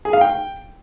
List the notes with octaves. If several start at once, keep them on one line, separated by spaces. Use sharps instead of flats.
G#4
F5
G5